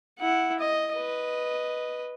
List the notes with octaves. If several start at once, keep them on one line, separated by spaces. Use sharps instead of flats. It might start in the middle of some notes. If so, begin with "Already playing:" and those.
E4 F#5
D#5
B4 D#5